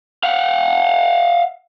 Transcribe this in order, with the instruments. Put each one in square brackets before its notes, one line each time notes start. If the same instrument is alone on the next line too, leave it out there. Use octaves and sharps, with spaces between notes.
[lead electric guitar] F5 F#5